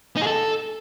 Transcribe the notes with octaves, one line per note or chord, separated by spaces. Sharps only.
D#4
G#4
A4